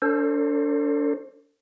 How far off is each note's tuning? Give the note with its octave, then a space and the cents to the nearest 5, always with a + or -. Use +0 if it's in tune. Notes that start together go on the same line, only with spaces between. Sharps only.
D4 -35 A4 +40 C5 +20